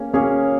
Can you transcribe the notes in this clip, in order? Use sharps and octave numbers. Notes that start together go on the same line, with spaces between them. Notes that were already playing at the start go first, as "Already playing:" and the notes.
Already playing: A#3 C#4 G#4
A#3 C#4 G#4 C#5